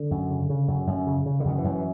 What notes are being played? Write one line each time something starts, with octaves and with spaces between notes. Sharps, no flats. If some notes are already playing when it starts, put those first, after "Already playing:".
Already playing: D3
F#2
C#3
C#3
F#2
F#2
C#3
C#3
D3
F#2 D#3
E3
F#2
E3